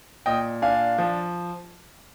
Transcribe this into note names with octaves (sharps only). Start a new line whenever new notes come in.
A#2 D#5 G5
D4 F5 G#5
F3